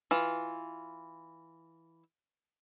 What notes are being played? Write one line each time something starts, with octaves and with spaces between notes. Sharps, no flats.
E3 F4